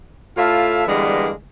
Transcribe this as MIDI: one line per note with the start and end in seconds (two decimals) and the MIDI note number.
0.37 0.86 45
0.37 0.86 65
0.37 0.86 69
0.37 0.86 76
0.37 0.86 77
0.87 1.31 50
0.87 1.31 52
0.87 1.31 55
0.87 1.31 56
0.87 1.31 58
0.87 1.31 59